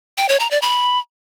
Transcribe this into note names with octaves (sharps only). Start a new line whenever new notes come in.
G5
C#5
A#5
D5
B5